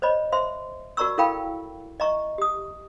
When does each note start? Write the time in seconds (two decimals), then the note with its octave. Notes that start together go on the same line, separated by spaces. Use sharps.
0.02 C5 C#5 D#5 B5
0.32 C5 E5 C6
0.97 F#4 A#4 D5 A#5 C#6 E6
1.18 E4 A4 A#4 F5 G5 B5
2.00 D#5 E5 A#5 C#6
2.38 G4 D#6